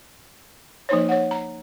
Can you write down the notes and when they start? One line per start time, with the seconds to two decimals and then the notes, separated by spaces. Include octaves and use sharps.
0.89 F3 A#3 D#4 C5 C#5
1.09 C#5 F#5
1.31 A#5